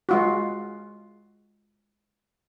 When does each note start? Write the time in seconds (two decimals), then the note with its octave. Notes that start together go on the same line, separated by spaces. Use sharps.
0.09 G#3 F4 F#4